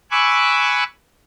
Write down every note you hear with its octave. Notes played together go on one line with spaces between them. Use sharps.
G#5 B5 C#6 D6 E6 F#6